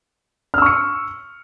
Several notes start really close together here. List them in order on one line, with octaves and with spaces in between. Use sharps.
F6 E6 C#6 C#7